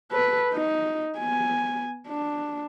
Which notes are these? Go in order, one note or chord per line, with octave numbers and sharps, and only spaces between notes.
A4 B4
D#4
B3 G#5
D4